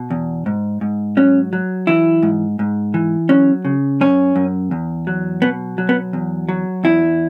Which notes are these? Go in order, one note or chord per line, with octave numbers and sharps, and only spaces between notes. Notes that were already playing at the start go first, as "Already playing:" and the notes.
Already playing: B2
E2
G#2
G#2
F#3 C#4
F#3
E3 E4
G#2
G#2
E3
F#3 C#4
C#3
F#2 C#4
F#2
E2
F#3
B2 B3
F#3
B3
E2
F#3
E2 E4